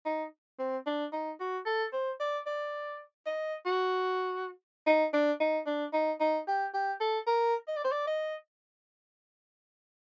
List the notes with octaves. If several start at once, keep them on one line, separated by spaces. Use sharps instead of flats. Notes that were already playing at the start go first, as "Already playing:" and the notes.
D#4
C4
D4
D#4
F#4
A4
C5
D5
D5
D#5
F#4
D#4
D4
D#4
D4
D#4
D#4
G4
G4
A4
A#4
D#5
D5
C5
D5
D#5